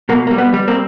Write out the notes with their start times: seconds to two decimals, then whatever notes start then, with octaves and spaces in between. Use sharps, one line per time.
0.09 B2 A#3
0.27 G3 A#3
0.38 B3
0.53 G3
0.68 A#3 C4